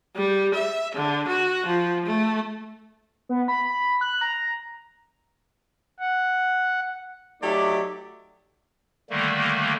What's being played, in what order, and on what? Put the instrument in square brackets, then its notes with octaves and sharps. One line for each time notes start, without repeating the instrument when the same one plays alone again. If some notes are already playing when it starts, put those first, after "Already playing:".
[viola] G3
E5
D3
F#4
F3
A3
[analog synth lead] B3
B5
B5
F#6
A#5
[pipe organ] F#5
[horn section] F#3 A3 D#4 G4 D5 E5
[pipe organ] D3 D#3 G3 A3 A#3